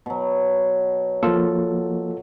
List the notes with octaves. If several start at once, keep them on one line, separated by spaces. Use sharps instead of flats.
B2 F#3
F3 A#3 F4 A4